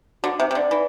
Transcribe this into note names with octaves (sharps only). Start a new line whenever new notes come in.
D3 F#4
C3 E5
C3
D3 D5
E3